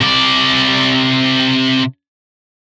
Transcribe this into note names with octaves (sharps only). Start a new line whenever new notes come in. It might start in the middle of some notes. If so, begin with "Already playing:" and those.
C3 D5